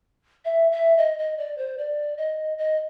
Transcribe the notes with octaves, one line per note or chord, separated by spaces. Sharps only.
E5
E5
D#5
D#5
D5
C5
D5
D#5
D#5